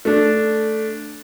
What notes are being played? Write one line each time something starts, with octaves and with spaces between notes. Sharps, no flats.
A3 D4